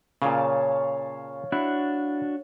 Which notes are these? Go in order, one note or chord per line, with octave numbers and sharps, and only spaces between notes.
A#2 C#3 C#5 F5 A5
D4 E4 F#4